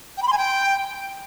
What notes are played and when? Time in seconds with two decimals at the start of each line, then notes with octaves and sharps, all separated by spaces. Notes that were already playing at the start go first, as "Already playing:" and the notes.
0.17 G5
0.22 B5
0.27 C6
0.32 G#5
0.37 G5